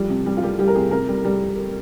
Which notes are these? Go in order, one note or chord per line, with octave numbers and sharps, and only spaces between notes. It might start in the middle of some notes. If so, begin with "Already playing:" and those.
Already playing: F3 G3
C3
G3
F4
G3 G4
G3 G4
A#4
C3 G#4
C3 A#4
G3
G3